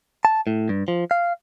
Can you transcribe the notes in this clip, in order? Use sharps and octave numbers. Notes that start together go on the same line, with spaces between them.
A5
A2
G2
F3
F5